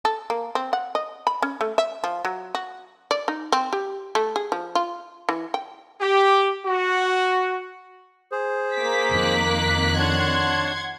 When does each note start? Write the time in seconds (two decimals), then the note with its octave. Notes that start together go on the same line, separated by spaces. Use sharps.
0.05 A4
0.30 A#3
0.55 C4
0.73 F#5
0.95 D#5
1.27 B5
1.42 C#4
1.61 A3
1.78 E5
2.04 F3
2.25 F#3
2.55 F#4
3.11 D5
3.28 D#4
3.52 C4
3.73 G4
4.15 A3
4.36 G#4
4.52 F3
4.75 F4
5.29 E3
5.54 G5
6.01 G4
6.65 F#4
8.32 G#4 C5
8.74 A#3 D6 B6
9.11 F2 D#3 F#6
9.98 D4 C#5 F#5 A5 C6 G#6